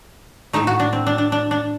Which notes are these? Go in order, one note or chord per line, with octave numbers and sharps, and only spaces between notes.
A2 A3 D#4
F#4
D4
C4
D4
D4
D4
D4